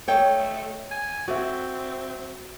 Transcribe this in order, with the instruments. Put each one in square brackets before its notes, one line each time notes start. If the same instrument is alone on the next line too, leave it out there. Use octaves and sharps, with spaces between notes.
[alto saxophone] A3 [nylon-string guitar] C#5 D#5 G5
[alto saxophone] G#5
[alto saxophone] C4 [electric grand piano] F#4 E5 [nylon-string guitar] D5